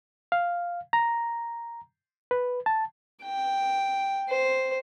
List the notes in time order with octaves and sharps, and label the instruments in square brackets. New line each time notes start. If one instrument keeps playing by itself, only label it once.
[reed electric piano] F5
A#5
B4
A5
[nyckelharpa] G5
C5